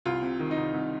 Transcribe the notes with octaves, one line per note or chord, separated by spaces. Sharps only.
C2 F4
C3
D#3
D#4
C2
C2